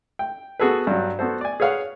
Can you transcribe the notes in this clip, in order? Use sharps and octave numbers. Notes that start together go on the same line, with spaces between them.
G5
B3 F#4 G#4 A4 B4
G2 F#3
B3 F#4 A4 C5
D5 G#5
G#4 B4 C#5 F5 F#5